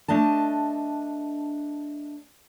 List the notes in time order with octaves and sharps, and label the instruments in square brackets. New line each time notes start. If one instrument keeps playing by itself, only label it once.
[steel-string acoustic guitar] A3 D4 D#5 A5